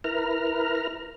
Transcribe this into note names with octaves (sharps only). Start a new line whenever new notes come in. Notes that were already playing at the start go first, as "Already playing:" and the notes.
E4 A#4 B4 A#5 F6